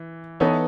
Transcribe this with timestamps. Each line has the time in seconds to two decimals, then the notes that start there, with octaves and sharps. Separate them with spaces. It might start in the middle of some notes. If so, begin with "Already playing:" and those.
Already playing: E3
0.40 E3 B3 D#4 A4 C#5